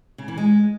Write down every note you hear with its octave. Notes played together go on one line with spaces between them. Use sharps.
C#3
E3
G#3